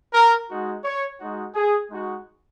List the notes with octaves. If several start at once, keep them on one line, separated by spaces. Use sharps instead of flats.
A#4
G#3 D#4 F#4
C#5
G#3 D#4 F#4
G#4
G#3 D#4 F#4